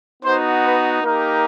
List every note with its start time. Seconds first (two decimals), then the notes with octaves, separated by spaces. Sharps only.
0.23 B3 D#4 F#4 C5
0.63 B4
1.03 A#3 D#4 G4 A#4